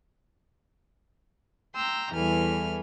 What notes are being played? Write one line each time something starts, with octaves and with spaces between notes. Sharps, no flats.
G5 A#5 C6 E6
E2 E3 G3 A4 G#5 F6